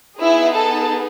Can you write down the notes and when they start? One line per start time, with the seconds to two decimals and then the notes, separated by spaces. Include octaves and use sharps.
0.21 B3 D#4 E4 G#4 E5
0.55 A4 A5